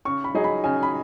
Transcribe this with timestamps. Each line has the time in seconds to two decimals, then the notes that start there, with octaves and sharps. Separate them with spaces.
0.05 C#3 C#6
0.24 B5
0.35 F#3 D#4 G#4
0.44 B5
0.64 C#3 G#5
0.83 B5